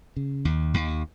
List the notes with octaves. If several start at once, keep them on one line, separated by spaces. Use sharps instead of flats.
C#3
D#2
D#2